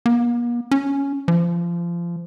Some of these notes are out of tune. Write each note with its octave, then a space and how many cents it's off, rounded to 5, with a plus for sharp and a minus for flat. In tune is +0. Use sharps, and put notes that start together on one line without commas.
A#3 +45
C#4 +5
F3 -25